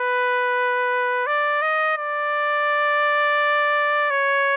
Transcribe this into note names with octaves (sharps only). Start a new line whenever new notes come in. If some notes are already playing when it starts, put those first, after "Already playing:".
Already playing: B4
D5
D#5
D5
C#5